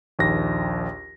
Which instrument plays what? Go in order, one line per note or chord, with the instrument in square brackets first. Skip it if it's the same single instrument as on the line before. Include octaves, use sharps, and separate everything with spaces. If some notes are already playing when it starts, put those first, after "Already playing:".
[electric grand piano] A#1 D#2 A#6